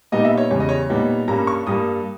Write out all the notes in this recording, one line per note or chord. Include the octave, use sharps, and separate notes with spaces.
A#2 G3 B3 D#4 D#5
E5
C#5
E2 C#3 G3 C#5
D#5
C#5
A#2 G3 B3 D#4
G2 G3 A#3 C#4 A#5
C#6
G2 G3 A#3 D#6